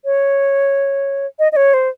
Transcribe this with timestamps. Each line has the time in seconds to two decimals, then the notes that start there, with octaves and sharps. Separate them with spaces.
0.05 C#5
1.39 D#5
1.52 D#5
1.56 C#5
1.74 C5